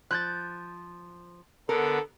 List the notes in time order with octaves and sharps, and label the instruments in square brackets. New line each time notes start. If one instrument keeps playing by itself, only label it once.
[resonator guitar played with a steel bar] F3 [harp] F#6 G6 A6
[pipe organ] D3 B3 [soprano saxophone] A4 [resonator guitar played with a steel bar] A#4